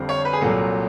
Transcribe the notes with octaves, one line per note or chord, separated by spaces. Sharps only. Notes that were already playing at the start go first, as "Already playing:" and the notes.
Already playing: F2 D3 G3 C4
C#5
B4
G#4
C2 A#2 F#3 A4